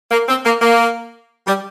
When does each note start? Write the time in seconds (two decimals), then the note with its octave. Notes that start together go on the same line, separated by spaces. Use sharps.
0.12 A#3
0.28 C4
0.45 A#3
0.62 A#3
1.47 G3